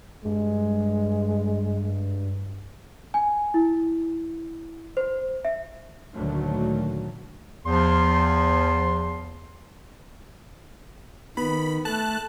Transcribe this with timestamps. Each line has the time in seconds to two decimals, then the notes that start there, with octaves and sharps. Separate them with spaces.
0.25 G2 G#3
3.14 G#5
3.54 E4
4.97 C5
5.45 E5
6.14 D2 A#2 D3 D#3 F#3 A3
7.66 E2 F3 C6
11.37 D#3 B3 B5
11.85 A3 A5 F#6